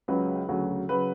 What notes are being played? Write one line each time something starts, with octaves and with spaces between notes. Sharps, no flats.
C#2 C#3 F#3 B4
D2 C#3 F#3
C#3 F#3 B4